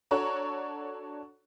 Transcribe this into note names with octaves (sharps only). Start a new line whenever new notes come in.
D4 F#4 A4 C#5 A#5